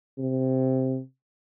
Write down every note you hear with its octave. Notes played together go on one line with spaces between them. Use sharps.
C3